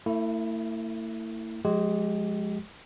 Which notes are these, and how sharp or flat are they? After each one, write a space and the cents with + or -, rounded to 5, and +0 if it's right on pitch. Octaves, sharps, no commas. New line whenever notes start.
A3 +40 E4 +0
F3 +35 G#3 +5 G4 -30